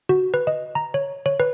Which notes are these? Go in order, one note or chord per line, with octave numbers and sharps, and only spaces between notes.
F#4
B4
D#5
A#5
C#5
C#5
B4